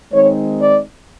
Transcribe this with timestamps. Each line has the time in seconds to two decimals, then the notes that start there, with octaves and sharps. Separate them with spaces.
0.13 D#3 G#3 C4 D#4 C#5
0.62 D5